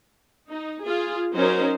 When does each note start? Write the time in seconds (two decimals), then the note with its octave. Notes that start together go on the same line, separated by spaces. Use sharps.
0.50 D#4
0.83 F4 G#4
1.36 F#3 C#4 D#4 A#4 C5